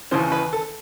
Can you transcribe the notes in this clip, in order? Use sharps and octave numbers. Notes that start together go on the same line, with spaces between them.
D#2 C#3 E3 C5
B4
A4